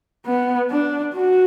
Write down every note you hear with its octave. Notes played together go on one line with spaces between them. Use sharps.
B3
D4
F#4